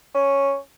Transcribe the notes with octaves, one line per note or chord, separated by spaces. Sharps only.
C#4